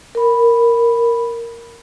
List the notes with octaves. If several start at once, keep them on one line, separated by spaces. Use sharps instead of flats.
A#4 B5